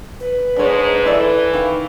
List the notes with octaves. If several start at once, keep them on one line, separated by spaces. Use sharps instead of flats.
B4
G#2 G#3 D4 C#5
E3 E4 A4 D5
D#3 F5